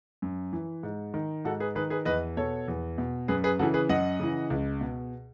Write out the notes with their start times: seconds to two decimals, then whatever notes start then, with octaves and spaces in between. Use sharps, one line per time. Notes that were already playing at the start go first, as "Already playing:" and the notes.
0.22 F#2
0.53 E3
0.83 G#2
1.14 D#3
1.45 G#2 F#4 A4
1.60 G#4 B4
1.75 D#3 G#4 B4
1.90 G#4 B4
2.05 E2 B4 D#5
2.37 B2 A4 C#5
2.68 E2
2.98 B2
3.28 F#2 G#4 B4
3.44 G#4 B4
3.59 C#3 E3 F#4 A4
3.74 G#4 B4
3.89 F#2 D#5 F#5
4.20 C#3 E3
4.50 C#2
4.81 B2